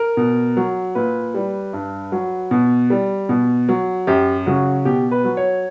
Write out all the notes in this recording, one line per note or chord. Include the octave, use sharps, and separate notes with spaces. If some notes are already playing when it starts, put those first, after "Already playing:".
Already playing: A#4
B2
F#3
A#2 B4
G3
G2
F#3
B2
G3
B2
F#3
F#2 G4
C#3 F#3 F#4
B2 G4
B4
F#3
C#5